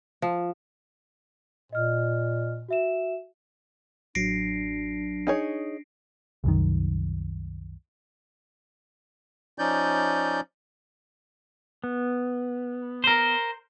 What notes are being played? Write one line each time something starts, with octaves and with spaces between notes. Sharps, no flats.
F3
A#2 D#5 F6
F#4 E5 E7
A1 F#3 D4 A#6 C7 D7
D#4 G#4 C#5
C2 F#2 D#3
F3 C#4 D#4 D5 G6
B3
A#4 C5